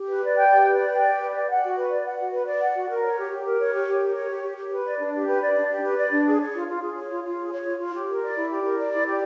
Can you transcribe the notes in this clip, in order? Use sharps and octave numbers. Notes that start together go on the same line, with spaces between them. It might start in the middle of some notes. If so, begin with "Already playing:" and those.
Already playing: G4
B4
D5
G5
G4
B4
D5
G5
G4
B4
D5
F#5
F#4
B4
D5
F#5
F#4
B4
D5
F#5
F#4
A#4
C#5
G4
G4
A#4
C#5
G4
G4
A#4
C#5
G4
G4
G4
B4
D5
D4
G4
B4
D5
D4
G4
B4
D5
D4
G#4
C#5
F4
F4
G#4
C#5
F4
F4
G#4
C#5
F4
F4
G4
A#4
D5
E4
G4
A#4
D5
E4
G4